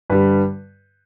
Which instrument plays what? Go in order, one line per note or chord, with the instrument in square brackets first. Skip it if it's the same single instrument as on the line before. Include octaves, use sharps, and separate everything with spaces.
[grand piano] G2 D3 G3 B4